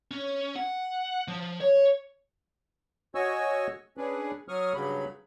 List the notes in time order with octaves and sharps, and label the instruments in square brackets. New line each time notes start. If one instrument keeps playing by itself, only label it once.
[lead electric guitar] C#4
F#5
F3
C#5
[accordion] F#4 C#5 D#5 G#5 C#6 E6
C#4 D4 G#4 B4
F#3 C#6 D#6 F6
G2 C#3 F#3 B5